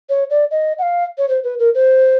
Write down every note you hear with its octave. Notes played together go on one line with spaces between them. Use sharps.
C#5
D5
D#5
F#5
F5
C#5
C5
B4
A#4
C5